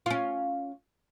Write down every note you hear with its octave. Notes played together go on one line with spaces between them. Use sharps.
C#4 F4